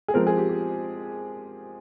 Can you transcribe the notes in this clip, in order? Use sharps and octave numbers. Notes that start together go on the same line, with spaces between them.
G#4
F3 G#3 C4 A#4
G#4
G4
G4